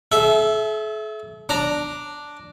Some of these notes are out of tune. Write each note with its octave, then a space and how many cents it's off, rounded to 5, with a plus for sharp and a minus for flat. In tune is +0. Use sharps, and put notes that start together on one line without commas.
A4 -45 E5 +0
D4 +0 A#5 -5